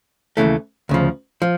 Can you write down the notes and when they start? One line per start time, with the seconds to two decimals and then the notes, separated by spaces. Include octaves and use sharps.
0.37 D#2 C#3 E3 A3
0.89 D2 C#3 F3
1.42 F3